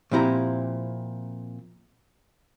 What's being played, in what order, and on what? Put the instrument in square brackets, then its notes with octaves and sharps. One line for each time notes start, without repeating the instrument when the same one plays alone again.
[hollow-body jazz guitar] A#2 F3 C4 E4 G4 A#5